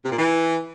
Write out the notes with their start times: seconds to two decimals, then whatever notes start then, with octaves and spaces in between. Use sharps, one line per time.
0.05 C3
0.12 A#2
0.19 E3